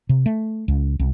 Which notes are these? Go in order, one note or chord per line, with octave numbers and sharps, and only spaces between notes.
C3
A3
C#2
C2